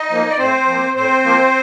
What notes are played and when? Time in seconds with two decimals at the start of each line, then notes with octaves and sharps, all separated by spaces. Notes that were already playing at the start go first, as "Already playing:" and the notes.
Already playing: D#4 D#5
0.10 F3 A#3
0.29 D5
0.38 A2 C4 C5
0.67 F3 A#3
0.95 A2 C4 C5
1.24 F3 A#3